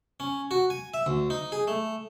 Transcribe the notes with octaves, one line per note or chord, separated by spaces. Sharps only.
C#4
F#4
G#5
E5
D2
D#4
G#4
A3